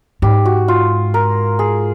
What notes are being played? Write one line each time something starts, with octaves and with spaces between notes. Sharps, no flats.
G#2 G4
F#4
F4
A#4
G#4